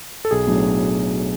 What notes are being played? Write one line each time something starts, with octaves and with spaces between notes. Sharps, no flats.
A4
B1 G#4
A2 F#3 B3 D4